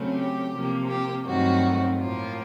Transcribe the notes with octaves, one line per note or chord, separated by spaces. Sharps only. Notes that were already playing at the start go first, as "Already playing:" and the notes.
Already playing: C#3 F#3 A3 C4
G4
C3 F3 A#3
G4
G2 D#3 F#3 A3 C4 F#4
A2 F3 A#3 F4